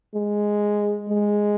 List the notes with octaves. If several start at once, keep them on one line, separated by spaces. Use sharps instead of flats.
G#3
G#3